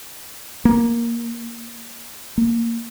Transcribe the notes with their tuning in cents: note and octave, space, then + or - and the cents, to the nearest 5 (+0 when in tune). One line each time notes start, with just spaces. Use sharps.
A#3 +5
A#3 -10